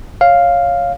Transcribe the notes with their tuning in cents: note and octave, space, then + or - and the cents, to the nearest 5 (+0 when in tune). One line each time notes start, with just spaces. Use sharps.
C#5 +0 F5 +0